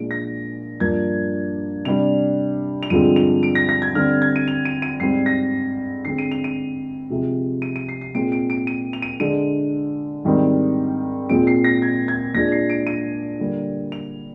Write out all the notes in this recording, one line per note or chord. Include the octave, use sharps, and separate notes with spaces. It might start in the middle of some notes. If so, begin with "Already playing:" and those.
Already playing: A#2 F3 G#3 D4 D7
A#6
G2 F3 A#3 D4 G#6
C3 G3 D4 F7
F7
G2 D3 F3 G#3 C4 D#7
F7
D7
A#6
A#6
G#6
D3 G3 C4 F6
G#6
D#7
F7
D#7
D#7
G#2 G3 C4 C7
A#6
D3 G#3 C4 C7
D#7
F7
D#7
C3 F3 G#3
D#7
D#7
C7
C7
A#2 G#3 C4 D7
D7
D7
D#7
F7
D#7
D3 G#3 D4 D#7
G#2 D#3 G3 C4
A#2 G#3 C4 D7
C7
A#6
G#6
G#6
A#2 G#3 D4 A#6
C7
D7
D#7
D3 G3 A#3
F7